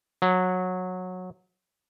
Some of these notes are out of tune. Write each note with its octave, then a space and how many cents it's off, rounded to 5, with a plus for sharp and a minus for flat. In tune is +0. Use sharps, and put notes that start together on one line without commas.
F#3 -15